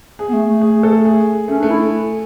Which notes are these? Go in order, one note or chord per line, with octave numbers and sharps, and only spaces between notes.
G#4
B3
A3
A3
G#4
A4
G#4
A3 C#4
D4
A3
E4